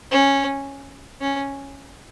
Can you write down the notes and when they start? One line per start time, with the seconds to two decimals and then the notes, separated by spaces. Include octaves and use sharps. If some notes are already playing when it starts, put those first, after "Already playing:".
0.11 C#4
1.21 C#4